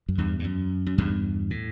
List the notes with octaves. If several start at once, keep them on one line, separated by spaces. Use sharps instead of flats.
F#2
E2 G2
G2
F#2
F#2
E2 G2
A2